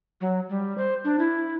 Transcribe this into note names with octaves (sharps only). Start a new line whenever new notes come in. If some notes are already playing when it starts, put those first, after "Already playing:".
F#3
G3
C5
D4
E4